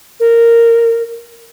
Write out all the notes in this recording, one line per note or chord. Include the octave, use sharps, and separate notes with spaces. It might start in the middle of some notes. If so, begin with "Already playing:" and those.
A#4